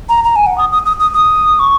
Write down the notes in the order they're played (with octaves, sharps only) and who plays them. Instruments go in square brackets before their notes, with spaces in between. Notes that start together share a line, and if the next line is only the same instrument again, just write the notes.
[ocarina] A#5
A#5
G#5
F#5
D#6
D#6
D#6
D#6
D#6
C#6